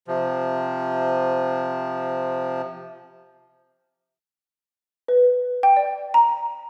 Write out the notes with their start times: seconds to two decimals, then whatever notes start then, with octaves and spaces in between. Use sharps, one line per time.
0.08 C3 F3
5.08 B4
5.63 G5
5.77 D5
6.14 A#5